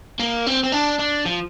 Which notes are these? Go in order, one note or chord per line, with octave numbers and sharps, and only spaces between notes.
A#3
C4
C4
D4
D4
F3